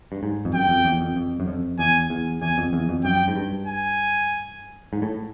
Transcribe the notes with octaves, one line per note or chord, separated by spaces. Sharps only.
G2
G#2
F2
F#2 G5
F2
E2
F2
F2
F#2
F2
E2 G#5
E2
E2 G#5
F2
E2
F2
F#2 G5
G#2
G2
G#5
G#2
A2